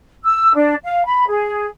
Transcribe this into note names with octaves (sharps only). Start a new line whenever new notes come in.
E6
D4
F5
B5
G#4